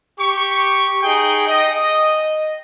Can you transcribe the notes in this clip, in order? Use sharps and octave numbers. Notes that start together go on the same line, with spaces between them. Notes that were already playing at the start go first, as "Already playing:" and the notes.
G4 C#6
D#4 G#4 G5
D#5